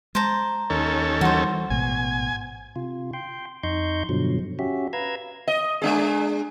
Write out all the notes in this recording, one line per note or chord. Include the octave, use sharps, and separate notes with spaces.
G#3 C5 A5 A#5
D#2 C#4 A4
E3 G3 F#4 C5
A1 G#2 B2 G#5
C3 F4
G5 C6
F2 D#4 D#5 C6 C#6 G6
G2 B2 D3 F3 F#3
C#4 F#4 G4 E5
B4 F5 A#5 E6 G#6
D#5
G#3 D4 G#4